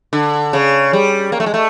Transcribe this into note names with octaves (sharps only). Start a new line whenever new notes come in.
D3
C#3
G3
A#3
A3
G#3
A3